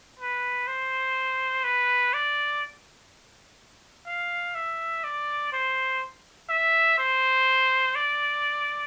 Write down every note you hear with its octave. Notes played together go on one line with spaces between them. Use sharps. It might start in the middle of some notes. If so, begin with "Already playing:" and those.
B4
C5
B4
D5
F5
E5
D5
C5
E5
C5
D5